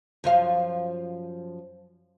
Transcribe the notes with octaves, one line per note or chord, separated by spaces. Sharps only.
F#2 F3 F5